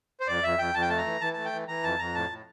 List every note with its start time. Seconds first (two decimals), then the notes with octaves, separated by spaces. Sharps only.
0.20 C5
0.27 F2 D5
0.43 F2 E5
0.59 F2 G5
0.74 F2 A5
0.82 G5
0.89 A3 A5
0.98 A#5
1.06 E3
1.21 E3 A5
1.33 A3 A5
1.45 G5
1.53 E3
1.68 E3 A#5
1.83 F2 A5
1.99 F2 A#5
2.15 A2 A5
2.30 A2